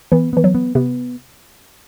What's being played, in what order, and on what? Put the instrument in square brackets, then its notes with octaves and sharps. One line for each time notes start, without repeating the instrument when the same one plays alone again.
[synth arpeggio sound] E3 [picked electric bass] B3
[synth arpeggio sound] E3 [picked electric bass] B3
[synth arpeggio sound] F#3
[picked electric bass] B3
[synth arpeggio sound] C3 [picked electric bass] B3